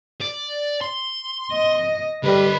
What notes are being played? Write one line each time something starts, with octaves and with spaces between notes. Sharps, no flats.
D5
C6
D#5
D3 G3 B4 D#5